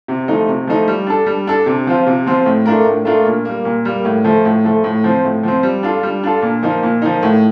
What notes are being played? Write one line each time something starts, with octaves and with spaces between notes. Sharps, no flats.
C3
F3 A3 D#4
C3
F3 A3 D#4
G3
D4 A4
G3
D4 A4
C3
F3 C4 F4
C3
F3 C4 F4
A2
A3 D4 F4 A#4
A2
A3 D4 F4 A#4
A#2
G3 A#3
A#2
G3 A#3
A2
F3 A3
A2
F3 A3
A2
F3 C4
A2
F3 C4
G3
D4 F4 A4
G3
D4 F4 A4
A#2
F3 A#3 D#4
A#2
F3 A#3 D#4
A2